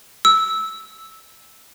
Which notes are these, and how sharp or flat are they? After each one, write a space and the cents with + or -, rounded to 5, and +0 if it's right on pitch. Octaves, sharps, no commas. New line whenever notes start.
E6 -10